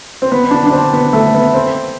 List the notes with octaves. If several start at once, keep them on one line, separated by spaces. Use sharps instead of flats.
C4
B3
D4
D4
C4
B3
A3
B3
C4